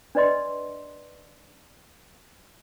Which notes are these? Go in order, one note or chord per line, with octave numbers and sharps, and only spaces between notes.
D4 B4 D5 D#5 C6